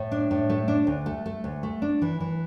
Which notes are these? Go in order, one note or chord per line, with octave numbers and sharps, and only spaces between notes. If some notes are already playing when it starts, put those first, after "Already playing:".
Already playing: A2
D4
A2
A3
D4
D2
A3
A3
D2
A3
D4
E3
E3